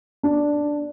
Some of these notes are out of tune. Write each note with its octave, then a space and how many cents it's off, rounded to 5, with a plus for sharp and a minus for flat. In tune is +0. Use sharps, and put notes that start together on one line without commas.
D4 +0